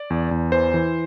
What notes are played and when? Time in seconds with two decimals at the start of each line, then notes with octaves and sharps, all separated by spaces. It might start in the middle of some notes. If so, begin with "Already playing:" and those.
Already playing: D5
0.10 E2
0.31 E2
0.52 E3 C5
0.74 E3